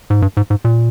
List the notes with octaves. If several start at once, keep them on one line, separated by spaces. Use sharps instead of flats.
G#2
G2
G#2
G#2
A#2